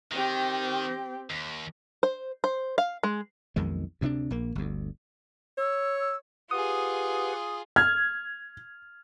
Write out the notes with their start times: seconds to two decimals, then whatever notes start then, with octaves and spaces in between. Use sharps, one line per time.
0.12 D#3 C4 G4
1.30 D#2
2.03 C5
2.44 C5
2.78 F5
3.03 G#3
3.56 B1 F2 D#3 G#3
4.01 D2 C3 G#3 D4
4.30 A#1 A#3
4.55 G1 D2
5.58 C#5 E6
5.99 E6
6.51 F4 G4 G#4 B4 F#5 D#6
7.76 F6 G#6